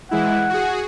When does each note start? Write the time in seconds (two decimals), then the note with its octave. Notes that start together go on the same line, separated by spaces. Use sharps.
0.11 E3 G#3 E4 F#5
0.49 F#4 G#4